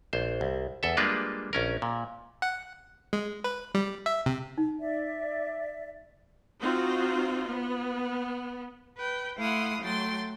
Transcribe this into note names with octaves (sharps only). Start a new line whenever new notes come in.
A#1 C5
C2
E2 A4 E5
G3 G#3 A#3 D4 F4 B4
A#1 C#4 A#4
A#2
F#5
G#3
B4
G3
E5
C3
D#4
D5 E5
C4 D#4 F4 F#4 C5
B3
B4 G5
A3 E4 F5 F#5 C6 D#6
F#3 A3 G5 C6 A6